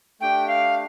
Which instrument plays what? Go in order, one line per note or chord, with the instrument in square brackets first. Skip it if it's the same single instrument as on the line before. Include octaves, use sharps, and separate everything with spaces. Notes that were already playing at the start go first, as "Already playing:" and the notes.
[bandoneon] A3 D4 G4 [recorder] G5
[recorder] F5